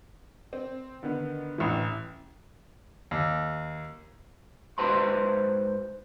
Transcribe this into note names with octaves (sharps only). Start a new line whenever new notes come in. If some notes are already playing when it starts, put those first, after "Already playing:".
C4
D3 D#3 B3
A1 E3
D#2
G#2 F#4 B4 C5 A#5 C6